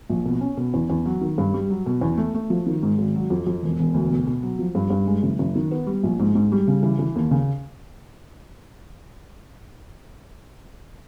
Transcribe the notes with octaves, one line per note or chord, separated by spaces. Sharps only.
A#1
B2
C#4
B2
E2
E2
F#3
D#3
G2
G3
F#3
B2
E2
A3
A3
F3
D#3
G#2
G#1
F#3
F2
F2
E1
E1
D2
B2
B2
F#3
F3
G2
G2
G#3
F#1
F#1
D#3
B3
G3
A#1
G#2
G#2
G3
C#3
E3
E3
D#2
C#3